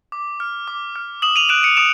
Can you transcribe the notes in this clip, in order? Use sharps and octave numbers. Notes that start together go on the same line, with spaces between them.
D6
F6
D6
F6
D#6 E7 F#7
D#7 F7
F#6 D7 E7
C#7 D#7
D#6 D7 E7